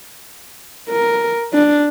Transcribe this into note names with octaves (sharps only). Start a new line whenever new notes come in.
A#4
D4